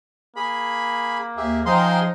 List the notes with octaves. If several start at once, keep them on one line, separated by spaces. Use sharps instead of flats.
A#3 G#4 B5
D#2 G4 G#4 E5
F3 D#4 G#4 C5 F5 G5 A#5 C6